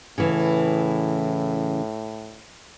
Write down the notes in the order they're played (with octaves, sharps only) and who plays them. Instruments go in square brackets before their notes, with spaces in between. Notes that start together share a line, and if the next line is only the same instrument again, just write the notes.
[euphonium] A2 [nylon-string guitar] C#3 E3